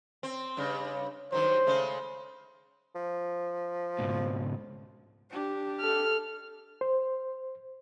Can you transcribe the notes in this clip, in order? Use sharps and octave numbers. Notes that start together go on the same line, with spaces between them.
C4
G2 C#3
G2 D#3 F#3 C5
C#3 G#3 A3
F3
C#2 G#2 B2
D4 G4
A4 F6
C5